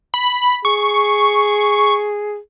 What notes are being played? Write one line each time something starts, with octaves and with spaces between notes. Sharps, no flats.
B5
G#4 C#6